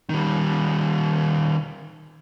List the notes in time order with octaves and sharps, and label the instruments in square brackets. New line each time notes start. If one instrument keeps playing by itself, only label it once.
[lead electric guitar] D#3 G3